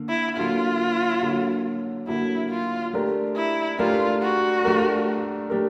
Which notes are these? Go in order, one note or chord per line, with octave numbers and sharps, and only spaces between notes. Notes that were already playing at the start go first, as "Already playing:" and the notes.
Already playing: D3 A#3
E4
D3 F#3 A#3 F4
D3 F#3 A#3
D3 F#3 A#3 E4
F4
A3 D4 G4 A#4
E4
A3 D4 F4 G4 A#4
F#4
A3 D4 G4 A#4
A3 D4 G4 A#4